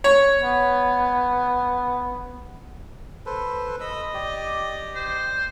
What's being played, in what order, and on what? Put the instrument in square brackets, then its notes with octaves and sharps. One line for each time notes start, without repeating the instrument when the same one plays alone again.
[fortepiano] C#5
[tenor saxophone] B3
[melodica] A4 B4 C5
[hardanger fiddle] D#5 [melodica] B5 E6
[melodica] G4 D5
[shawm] C5